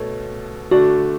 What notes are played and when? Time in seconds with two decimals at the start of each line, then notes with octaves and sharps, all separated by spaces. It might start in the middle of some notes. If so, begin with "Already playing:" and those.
Already playing: B2 A3 A4 C#5
0.71 D3 A3 D4 F#4